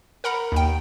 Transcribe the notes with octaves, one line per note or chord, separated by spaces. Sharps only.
A#4 F#5 A#5 B5
D#2 G5